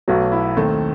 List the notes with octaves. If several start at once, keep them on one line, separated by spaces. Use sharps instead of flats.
B1 B2 F#3 A3 F#4
E4
D#2 D#3 A3 C4